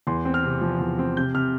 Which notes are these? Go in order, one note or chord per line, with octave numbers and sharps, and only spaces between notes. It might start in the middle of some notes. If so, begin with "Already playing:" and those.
E2 C6
C4
F6
C3
F3
E2
C4
C3 G6
C3 F6